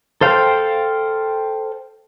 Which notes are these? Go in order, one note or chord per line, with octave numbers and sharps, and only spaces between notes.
A4 C5 F5 G5